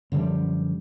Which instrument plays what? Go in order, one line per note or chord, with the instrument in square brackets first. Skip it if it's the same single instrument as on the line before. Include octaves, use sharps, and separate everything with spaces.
[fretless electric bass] F#2 D3 F3 G3